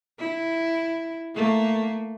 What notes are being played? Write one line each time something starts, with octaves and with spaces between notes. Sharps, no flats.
E4
A3 A#3